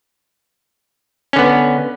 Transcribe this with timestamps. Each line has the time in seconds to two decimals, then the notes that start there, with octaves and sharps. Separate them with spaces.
1.33 C#4
1.36 D3
1.38 B3